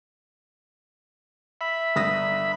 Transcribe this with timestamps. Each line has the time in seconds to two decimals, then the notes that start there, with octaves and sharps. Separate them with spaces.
1.61 E5 B5
1.96 G1 D#6 A#6